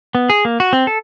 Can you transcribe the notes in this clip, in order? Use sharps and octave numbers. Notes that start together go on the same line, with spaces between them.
B3
G#4
A#3
F#4
C4
A4